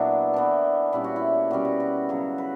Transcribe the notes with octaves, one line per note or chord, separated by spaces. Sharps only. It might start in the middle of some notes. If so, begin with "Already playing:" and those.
Already playing: A#2 F#3 B3 D4 E4
E3 B3 D4
A#2 G3 C#4 E4
F#4
E4
B2 G3 C#4 F#4
F#4
F#4
C#3 F#3 B3
B4